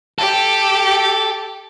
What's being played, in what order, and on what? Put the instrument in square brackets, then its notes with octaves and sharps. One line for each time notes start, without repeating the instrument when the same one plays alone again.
[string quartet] G4 [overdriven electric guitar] A4